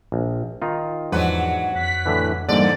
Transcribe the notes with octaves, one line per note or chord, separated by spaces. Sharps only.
A#1
D#3 D#4 F4
E2 G#2 F3 F#3 D4 B4 F#5
F2 F#6 B6
A2 D3 E3
E2 G#2 D3 G3 A#3 D5